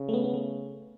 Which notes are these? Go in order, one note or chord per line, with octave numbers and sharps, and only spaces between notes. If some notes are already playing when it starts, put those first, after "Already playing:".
Already playing: C#3
A3
B3
B3
A3